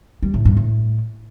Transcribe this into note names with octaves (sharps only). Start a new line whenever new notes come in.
G3
A2
G2
A2